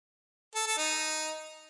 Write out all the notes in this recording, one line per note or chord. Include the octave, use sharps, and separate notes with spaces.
A4
A4
D#4